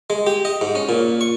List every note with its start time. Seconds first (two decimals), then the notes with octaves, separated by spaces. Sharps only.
0.10 G#3
0.27 G4
0.45 D#5
0.61 G#2
0.75 C#4
0.89 A#2
1.21 C#6